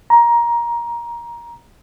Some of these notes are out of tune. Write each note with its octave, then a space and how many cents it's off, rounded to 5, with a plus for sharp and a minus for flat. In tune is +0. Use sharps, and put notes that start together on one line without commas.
A#5 +15